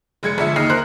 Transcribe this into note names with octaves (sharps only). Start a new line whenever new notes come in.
F1 G#3 G#6 C#7
G1 F3 G#3 E5 C#7
D#2 D#4 F6 C7
A#4 C5 F#6